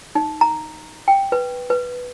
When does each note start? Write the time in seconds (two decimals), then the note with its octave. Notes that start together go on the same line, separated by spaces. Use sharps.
0.15 D#4
0.41 A#5
1.08 G5
1.32 B4
1.70 B4